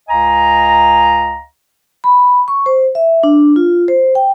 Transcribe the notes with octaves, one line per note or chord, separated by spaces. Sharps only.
C#2 D#5 F5 G#5 A#5
B5
C#6
C5
E5
D4
F4
C5
G5